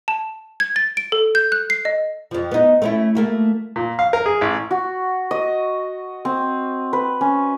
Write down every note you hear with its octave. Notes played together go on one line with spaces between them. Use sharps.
A5
G#6
A6
D7
A4
G6
F#6
C7
D#5
F2 F3
B3 D#4
A3 C#4 E4
A3 A#3 F#4
A#2
F5
A#4
G#4
A1
F#4
D#5
C4
B4
C#4